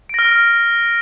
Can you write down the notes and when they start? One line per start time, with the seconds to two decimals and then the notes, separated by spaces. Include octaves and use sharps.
0.09 D7
0.14 A#6
0.19 F6